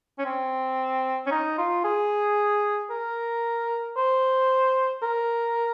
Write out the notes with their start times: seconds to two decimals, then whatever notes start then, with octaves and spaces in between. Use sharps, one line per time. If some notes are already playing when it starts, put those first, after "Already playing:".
0.19 C#4
0.25 C4
1.26 C#4
1.31 D#4
1.58 F4
1.84 G#4
2.90 A#4
3.97 C5
5.03 A#4